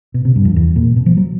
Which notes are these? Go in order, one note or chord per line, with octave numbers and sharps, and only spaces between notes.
B2
C3
G2
F2
E2
A#2
B2
F3
F#3